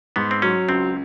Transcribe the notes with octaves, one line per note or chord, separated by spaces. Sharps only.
G#2 B3
C4
F#3 C#4
C#2 C4